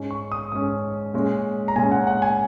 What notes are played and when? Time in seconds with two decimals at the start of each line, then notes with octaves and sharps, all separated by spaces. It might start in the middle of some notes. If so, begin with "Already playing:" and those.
Already playing: G#2 G#3 C#4
0.11 C#6
0.32 D#6
0.52 G#2 G#3 C#4 D#6
1.14 A#2 G#3 C#4
1.68 A#5
1.76 A#2 G#3 C#4 G#5
1.92 F#5
2.07 F#5
2.22 G#5